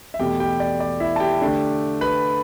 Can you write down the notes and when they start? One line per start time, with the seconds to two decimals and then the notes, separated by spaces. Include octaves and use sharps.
0.14 E5
0.19 E2 B2 A3 G4 G5
0.40 G4 G5
0.60 D5
0.80 D5
1.00 E4 E5
1.16 A5
1.20 G4 G5
1.42 D3 A3 D4
2.01 B4 B5